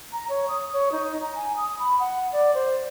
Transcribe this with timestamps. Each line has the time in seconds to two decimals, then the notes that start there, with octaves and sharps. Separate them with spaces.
0.13 A#5
0.29 C#5
0.49 D#6
0.73 C#5
0.92 D#4
1.21 A#5
1.35 G#5
1.56 D#6
1.79 B5
2.00 F#5
2.32 D5
2.55 C5